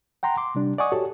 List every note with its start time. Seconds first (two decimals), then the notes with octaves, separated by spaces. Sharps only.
0.23 F#5 G5 A#5 C6
0.37 C6 D6
0.55 C3 G3 D4
0.78 D5 D#5 F#5 G#5 C#6 D#6
0.92 F#4 G4 A4 C#5